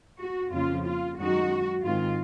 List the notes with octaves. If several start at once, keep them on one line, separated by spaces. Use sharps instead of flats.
F#4
F2 C#3 F3 A#3 F4
F4
F#2 D#3 G#3 D#4 F#4
G#2 D#3 G#3 C4 F4